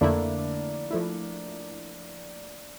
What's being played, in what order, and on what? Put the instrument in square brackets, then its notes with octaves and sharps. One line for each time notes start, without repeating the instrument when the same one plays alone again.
[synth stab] F2 D3 A3 E4 [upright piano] A#3 D4
[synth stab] F3 A3 E4